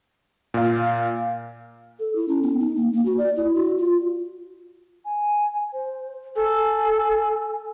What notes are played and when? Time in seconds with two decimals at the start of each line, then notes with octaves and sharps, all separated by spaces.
0.54 A#2 F5
1.99 A4
2.16 E4
2.28 C#4
2.43 B3
2.60 D#4
2.77 A#3
2.93 A#3
3.06 F#4
3.18 D5
3.37 E4
3.55 F#4
3.78 F4
5.05 G#5
5.73 C5
6.36 A4 G#5